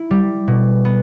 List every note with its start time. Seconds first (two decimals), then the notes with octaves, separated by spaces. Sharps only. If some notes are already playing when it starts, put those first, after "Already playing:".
Already playing: E4
0.11 G3
0.48 B2
0.85 B3